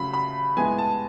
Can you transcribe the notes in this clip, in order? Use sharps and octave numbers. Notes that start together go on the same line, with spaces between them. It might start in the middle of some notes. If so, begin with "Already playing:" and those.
Already playing: C#3 F#3 A3 B5
B5
A2 G#3 B3 G#5
A5